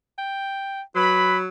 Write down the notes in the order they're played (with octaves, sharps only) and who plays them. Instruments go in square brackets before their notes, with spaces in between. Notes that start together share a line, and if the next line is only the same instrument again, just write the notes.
[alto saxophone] G5
[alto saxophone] F#3 [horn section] B4 B5